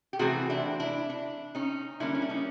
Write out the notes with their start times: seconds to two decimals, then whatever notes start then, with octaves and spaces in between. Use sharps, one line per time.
0.13 G4
0.19 C3 E3 A3 C4 F#4 G#4
0.50 D4 E4
0.80 D4 E4
1.10 D4
1.55 C#4 D#4
2.00 D3 G3 A#3 C#4 D4 E4
2.15 C#4
2.22 D4
2.29 C#4 D#4